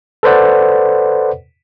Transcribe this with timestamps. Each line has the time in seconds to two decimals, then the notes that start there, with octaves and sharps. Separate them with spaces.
0.23 A4 B4 C5 D5 F#5